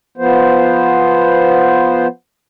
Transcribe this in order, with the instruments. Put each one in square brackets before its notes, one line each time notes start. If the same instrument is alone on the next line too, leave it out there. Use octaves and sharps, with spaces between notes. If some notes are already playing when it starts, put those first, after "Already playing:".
[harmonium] F3 B3 C5